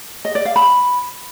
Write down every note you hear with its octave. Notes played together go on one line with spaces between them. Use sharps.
D#5
D5
F5
B5